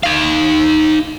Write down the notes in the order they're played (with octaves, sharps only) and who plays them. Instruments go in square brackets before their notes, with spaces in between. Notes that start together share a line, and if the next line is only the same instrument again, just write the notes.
[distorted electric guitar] D#4 F5